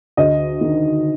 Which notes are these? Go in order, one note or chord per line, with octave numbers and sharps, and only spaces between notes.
D2 D#5
D#3